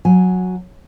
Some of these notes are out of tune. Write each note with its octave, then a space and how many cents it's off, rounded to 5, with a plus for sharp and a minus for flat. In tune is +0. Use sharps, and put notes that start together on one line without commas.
F#3 -15 G#5 +5